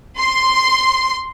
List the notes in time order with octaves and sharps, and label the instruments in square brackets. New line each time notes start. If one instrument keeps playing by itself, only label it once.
[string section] C6